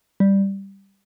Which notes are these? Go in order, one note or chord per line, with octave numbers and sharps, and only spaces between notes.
G3